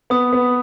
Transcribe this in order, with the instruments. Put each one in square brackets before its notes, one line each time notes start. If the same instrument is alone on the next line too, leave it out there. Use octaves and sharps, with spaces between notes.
[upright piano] B3 [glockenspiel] D#6
[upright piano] B3